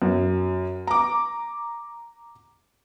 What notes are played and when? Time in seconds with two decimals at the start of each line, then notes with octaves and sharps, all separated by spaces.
0.02 F#2
0.87 A#5 D6